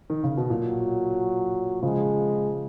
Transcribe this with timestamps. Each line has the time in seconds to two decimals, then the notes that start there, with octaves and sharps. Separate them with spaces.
0.10 D#3
0.24 C#3
0.37 B2
0.50 A#2 F#3
1.83 C#3 F3 G#3